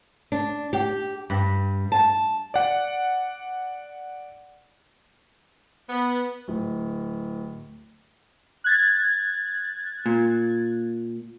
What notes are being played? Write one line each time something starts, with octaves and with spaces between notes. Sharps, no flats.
D4
G4
G2
A5
D5 F#5
B3
D1
F#6 G#6 A6
A#2